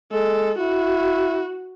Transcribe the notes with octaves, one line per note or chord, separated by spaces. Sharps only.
G#3 A4
E4 F#4